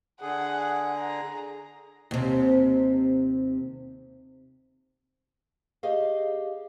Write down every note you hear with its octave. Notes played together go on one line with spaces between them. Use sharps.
D3 G#4 F#5
A#5
D#2 C3
G4 G#4 D#5 F5